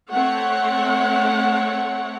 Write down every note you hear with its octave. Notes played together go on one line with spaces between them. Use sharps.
A3 C4 C#5 F#5